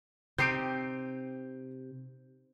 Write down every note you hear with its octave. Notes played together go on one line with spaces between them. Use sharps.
C3 C4 D#4 G4 G6 C7 D7